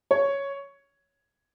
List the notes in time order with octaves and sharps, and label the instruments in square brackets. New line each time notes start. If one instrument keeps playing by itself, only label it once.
[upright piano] C#5